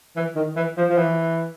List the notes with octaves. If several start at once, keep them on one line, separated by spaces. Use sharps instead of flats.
E3
D#3
E3
F3
F3
E3